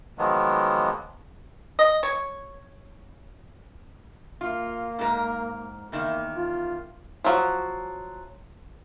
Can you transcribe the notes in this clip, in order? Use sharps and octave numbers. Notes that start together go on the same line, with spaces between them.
D#3 F3 F#3 G#3 A#3 B3
D#5
C#5
A#3 F4
G#2 A#4
E2 D#3 A#3
F4
F3 F#3